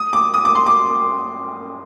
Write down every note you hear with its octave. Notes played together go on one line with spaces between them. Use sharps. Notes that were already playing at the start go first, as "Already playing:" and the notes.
Already playing: D#6
D6
D#6
D6
C6
D6